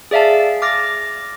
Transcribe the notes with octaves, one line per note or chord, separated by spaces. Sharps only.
G#4 D5 E5 F5 A5
D6 F6 A6 A#6